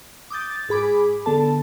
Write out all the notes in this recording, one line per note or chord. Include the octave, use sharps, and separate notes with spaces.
D6 D#6 G6 A6
A6
G#2 G#4 B5 D6
D3 B3 A4 A5